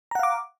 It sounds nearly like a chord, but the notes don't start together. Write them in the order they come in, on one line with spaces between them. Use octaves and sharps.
A#5 F#5 F5 D6